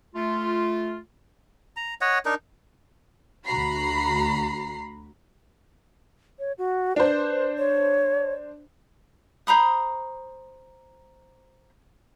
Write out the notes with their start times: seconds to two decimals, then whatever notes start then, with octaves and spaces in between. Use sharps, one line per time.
0.15 A3 F4
1.76 A#5
2.01 C#5 D#5 F#5
2.25 D4 D#4 A#4
3.46 D2 F#4 A#5 B5 C7
6.39 C#5
6.58 F#4
6.96 D4 B4 C5
7.58 C#5
9.47 C5 A#5 B5 D#6